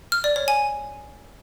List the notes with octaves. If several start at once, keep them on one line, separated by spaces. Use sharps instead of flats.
F6
D5
C#5
G#5